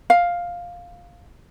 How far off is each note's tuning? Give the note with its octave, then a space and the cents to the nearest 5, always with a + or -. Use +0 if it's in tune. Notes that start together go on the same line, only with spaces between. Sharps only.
F5 +5